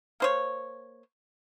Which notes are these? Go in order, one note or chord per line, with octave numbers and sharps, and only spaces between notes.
A#3 C5 C#5